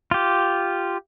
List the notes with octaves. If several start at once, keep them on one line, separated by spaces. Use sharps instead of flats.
F4 G4